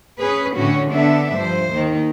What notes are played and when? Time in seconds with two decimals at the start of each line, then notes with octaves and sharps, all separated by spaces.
0.19 C#4 G#4 B4
0.56 A2 D3 C#4 F#4
0.91 D3 B3 D4 A4 E5
1.36 G2 F3 C5
1.71 D#2 D#3